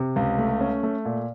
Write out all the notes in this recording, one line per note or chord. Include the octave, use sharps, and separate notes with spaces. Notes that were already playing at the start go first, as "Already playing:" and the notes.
Already playing: C3
C#2
A3
C#4
A3
A#2